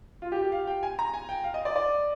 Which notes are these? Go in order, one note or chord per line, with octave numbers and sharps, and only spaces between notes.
F4
G4
G4
F5
G5
G#5
A#5
G#5
G5
F5
D#5
D5
D5